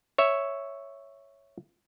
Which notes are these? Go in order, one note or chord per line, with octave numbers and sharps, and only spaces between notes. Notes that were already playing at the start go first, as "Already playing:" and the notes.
C#5 E5